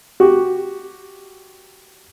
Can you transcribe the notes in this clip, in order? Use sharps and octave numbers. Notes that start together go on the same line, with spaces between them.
F#4 G4